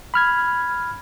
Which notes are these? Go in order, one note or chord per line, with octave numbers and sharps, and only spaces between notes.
B5 F6 G#6